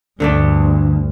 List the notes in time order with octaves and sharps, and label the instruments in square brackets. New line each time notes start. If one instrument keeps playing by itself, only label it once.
[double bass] D2 G2 [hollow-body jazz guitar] D3 A3 D4